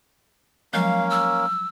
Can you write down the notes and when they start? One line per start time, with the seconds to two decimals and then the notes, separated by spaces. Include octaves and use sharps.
0.74 F3 F#3 G#3 A#3 C#4 F5
1.10 E6